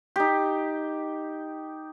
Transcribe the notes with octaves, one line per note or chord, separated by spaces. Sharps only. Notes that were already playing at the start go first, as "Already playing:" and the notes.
D#4 G4